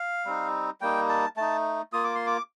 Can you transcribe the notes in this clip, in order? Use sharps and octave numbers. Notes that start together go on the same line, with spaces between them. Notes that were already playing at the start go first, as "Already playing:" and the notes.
Already playing: F5
G3 C4 D#4
G3 A#3 D#4 G5
A5
A3 D#4 A5
A#3 F4 D#6
D6
C6
D6